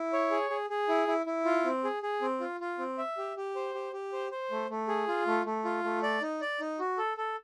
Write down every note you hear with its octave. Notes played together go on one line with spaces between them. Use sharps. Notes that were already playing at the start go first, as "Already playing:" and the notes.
Already playing: E4
C#5
G#4
G#4
G#4
E4
E4
E4
F4
C4
G#4
G#4
C4
F4
F4
C4
E5
G4
G4
C5
G4
G4
C5
C5
A3
A3
G#4
F4
A3
A3
F4
A3
D5
D#4
D5
D#4
F#4
A4
A4